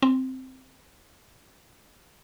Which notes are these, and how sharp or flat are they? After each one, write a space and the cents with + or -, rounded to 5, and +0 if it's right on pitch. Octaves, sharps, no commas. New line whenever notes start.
C4 -5